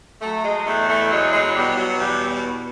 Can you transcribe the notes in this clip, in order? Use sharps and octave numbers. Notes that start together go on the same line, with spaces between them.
F#3 A3
G#3
E2 A3
A3
F#3 G#3
G#3
B2 G3
F#3
E2 G3